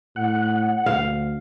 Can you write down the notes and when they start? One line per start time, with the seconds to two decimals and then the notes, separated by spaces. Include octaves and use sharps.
0.16 A2 F#5
0.86 D2 F5